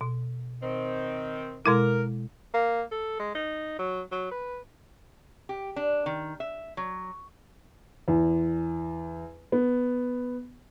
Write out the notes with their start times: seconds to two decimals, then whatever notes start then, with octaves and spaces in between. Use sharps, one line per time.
0.01 B2
0.63 D#3 C4
1.66 B2 G#3 E4 A#4
2.54 A#3
2.91 A4
3.20 G#3
3.35 D#4
3.79 F#3
4.12 F#3
4.32 B4
5.49 G4
5.76 D4
6.06 D#3
6.40 E5
6.77 F#3
8.08 E2
9.52 B3